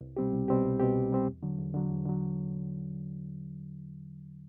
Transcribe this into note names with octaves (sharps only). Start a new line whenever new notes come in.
C2
B2 G3 C4 G4
C2
B2 G3 C4 G4
C2
B2 G3 C4 G4
C2
B2 G3 C4 G4
E2
D3 F#3
E2
D3 F#3
E2
D3 F#3